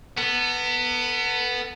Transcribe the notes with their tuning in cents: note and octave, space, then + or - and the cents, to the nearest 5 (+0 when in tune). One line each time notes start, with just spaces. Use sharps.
B3 +0 A4 +40